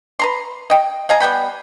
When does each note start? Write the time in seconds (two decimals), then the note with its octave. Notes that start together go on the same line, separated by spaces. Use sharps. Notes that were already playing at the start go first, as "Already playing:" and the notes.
0.19 B4 A#5 C6
0.70 D#5 G5
1.09 D#5 F5 G#5 A#5
1.20 G3 B3 G5 B5